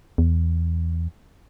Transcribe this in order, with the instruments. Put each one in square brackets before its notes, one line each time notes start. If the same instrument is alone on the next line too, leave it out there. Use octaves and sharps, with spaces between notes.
[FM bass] E2